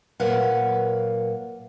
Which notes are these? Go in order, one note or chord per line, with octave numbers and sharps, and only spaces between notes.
A#2 F#3 A#4 B4 F5 F#5